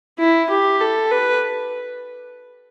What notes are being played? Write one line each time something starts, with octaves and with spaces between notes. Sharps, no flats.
E4
G4
A4
B4